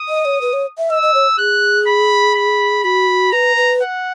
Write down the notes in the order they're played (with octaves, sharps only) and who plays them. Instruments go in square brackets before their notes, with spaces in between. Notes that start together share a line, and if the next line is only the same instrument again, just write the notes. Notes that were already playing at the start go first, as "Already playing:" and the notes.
Already playing: [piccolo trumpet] D#6
[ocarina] D#5
C#5
B4
C#5
E5
[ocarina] D#5 [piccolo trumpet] E6
[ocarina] D#5
C#5
[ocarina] G#4 [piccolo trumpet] F#6
[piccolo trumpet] B5
B5
[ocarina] F#4 [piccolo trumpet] B5
[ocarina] B4 [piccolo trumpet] A#5
[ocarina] B4
[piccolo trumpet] F#5